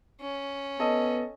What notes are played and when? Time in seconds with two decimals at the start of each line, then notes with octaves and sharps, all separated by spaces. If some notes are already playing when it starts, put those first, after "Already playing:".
0.21 C#4
0.79 B3 A4 D#5